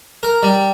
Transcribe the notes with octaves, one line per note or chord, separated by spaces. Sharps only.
A#4
G3